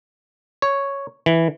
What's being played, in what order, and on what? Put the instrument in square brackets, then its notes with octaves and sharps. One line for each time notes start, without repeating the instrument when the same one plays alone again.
[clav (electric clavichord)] C#5
E3